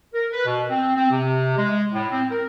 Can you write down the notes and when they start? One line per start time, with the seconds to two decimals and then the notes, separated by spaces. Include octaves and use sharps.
0.14 A#4
0.32 B4
0.45 B2
0.70 C4
0.95 C4
1.11 C3
1.57 G#3
1.93 A2
2.11 C4
2.30 A#4